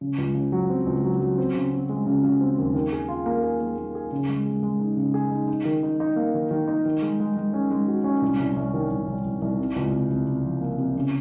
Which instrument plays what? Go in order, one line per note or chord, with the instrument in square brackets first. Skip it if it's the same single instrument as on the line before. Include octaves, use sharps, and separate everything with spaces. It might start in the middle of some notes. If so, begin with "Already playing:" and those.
[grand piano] C#3
C#2
C#3
F#3
C4
C#2
F#3
F#3
C4
C#3
C4
G#3
C#3
C#3
C4
D#2
D#3
G#4
F4
A#3
G#4
A#3
A#3
G#4
C#3
G#3
G#3
G#3
D#4
C#3
G#4
D#4
D#4
D#3
D#4
D#4
A#3
D#3
D#3
D#4
D#3
G#3
G#3
G#3
C#4
G#3
F#4
C#4
C2
C2
C2
D#3
C2
C2
C2
C2
C3
C#2
C3
C3
C3
F3
A#3
C3
C#3